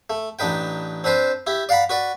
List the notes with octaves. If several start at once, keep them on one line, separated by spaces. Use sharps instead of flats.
A3
A1 D4 D#4 B4 G5
C4 D4 B4 C5
E4 G4
D5 F5 F#5 A#5 B5
F#4 B4 D5